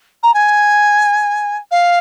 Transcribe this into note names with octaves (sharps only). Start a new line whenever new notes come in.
A#5
G#5
F5